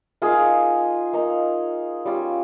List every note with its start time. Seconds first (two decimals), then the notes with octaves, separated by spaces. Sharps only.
0.22 A#3 D#4 F4 G#4
1.13 A#3 D#4
2.05 G3 C#4 F4